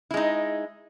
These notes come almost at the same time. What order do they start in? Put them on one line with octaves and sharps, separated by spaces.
E4 G#3 D#4